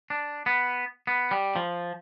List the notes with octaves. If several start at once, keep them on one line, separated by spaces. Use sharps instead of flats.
D4
B3
B3
G3
F3